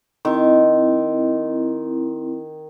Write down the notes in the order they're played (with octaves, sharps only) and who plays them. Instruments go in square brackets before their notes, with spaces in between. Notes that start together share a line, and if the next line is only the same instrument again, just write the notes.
[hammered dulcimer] D#3 [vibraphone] C4 E4